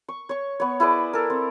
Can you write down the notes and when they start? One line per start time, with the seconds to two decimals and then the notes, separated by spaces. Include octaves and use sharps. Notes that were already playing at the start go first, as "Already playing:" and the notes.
0.09 C#6
0.29 C#5 C#6
0.60 B3 C#5
0.80 E4 G#4 B4 D5
1.13 A4 A#4
1.30 C4